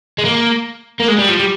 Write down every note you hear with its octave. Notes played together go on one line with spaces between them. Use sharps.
G#3
A#3
A#3
G#3
G3
F3
G3